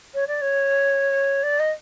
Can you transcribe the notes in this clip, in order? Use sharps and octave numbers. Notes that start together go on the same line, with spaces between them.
C#5
D5
C#5
D5
D#5